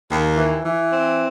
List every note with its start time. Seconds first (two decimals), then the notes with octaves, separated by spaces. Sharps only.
0.09 D#2
0.36 E3
0.64 E3
0.92 C4